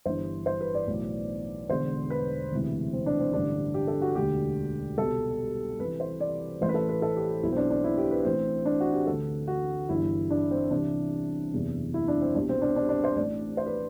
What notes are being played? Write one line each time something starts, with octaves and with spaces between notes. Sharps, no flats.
G1 G2 E3 C5
C5
B4
D5
B1 A2 E3
E1 E2 D3 C5
B4
E1 D2 C3 E3
C4
D4
C4
A1 G2 D3 D4
G4
A4
F#4
E1 D2 D3 G4
C2 B2 A4
C2 C3 E3 B4
C5
D5
A1 A2 E3 C5
B4
A4
B4
A4
G4
B1 B2 E4
C4
D4
D4
E4
G4
B4
A1 A2 E3 C4
D4
F#4
G4
D2 D3 A4
F#4
G1 G2 E3 E4
D4
C4
C2 C3 E3 D4
F#1 E2 C3 E3
E4
D4
C4
C2 B2 D4
C4
D4
D4
D4
C5
A1 A2 E3 D5
C5
B4